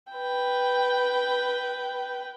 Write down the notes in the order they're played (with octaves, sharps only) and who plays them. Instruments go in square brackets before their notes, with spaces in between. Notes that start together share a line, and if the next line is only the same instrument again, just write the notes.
[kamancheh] B4 G5